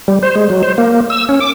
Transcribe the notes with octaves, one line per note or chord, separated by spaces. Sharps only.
G3
C5
G#3
F#3
C5
A#3
E6
C#4
D6